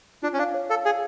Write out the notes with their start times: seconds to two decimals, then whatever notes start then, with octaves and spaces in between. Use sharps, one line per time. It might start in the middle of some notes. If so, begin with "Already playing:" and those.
0.23 D4 F4
0.34 C#4
0.39 D4 F5
0.54 C#5
0.70 A4 F5
0.85 G#4 F5